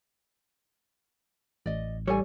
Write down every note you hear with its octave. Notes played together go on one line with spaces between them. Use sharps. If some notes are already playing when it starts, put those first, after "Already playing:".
A1 D5 D#5
G3 D#4 A4 C#5 G#5